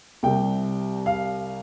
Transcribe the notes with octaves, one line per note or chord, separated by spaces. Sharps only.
C2 C3 G3 G5
F5